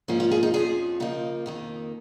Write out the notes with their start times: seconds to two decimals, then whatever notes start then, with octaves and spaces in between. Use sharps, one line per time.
0.08 G#2 F3 A#3 C#4
0.20 F4
0.31 G#4
0.43 D#4
0.54 F2 F3 C#4 G#4
1.00 C#3 F3 A#3 D#4
1.46 F2 D#3 A#3